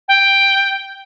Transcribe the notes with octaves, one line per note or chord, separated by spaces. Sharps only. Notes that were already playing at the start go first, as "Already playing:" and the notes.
G5